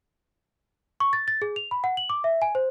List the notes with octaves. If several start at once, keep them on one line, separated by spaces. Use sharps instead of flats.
C#6
A6
A6
G#4
F7
B5
F#5
F#7
D6
E5
G#5
C5